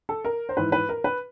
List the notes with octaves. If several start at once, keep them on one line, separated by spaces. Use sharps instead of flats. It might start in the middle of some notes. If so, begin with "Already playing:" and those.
A4
A#4
C5
G#2 E3 B4
B4
A#4
B4